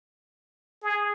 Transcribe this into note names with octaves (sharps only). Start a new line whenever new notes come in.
G#4